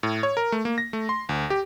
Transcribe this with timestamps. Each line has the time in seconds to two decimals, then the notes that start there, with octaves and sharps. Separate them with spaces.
0.03 A2
0.23 C#5
0.37 A#4
0.52 A3
0.65 A#3
0.78 A#6
0.93 A3
1.09 C6
1.29 D2
1.50 G4